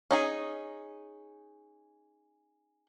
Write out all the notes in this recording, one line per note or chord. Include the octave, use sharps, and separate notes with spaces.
C#4 D#4 G#4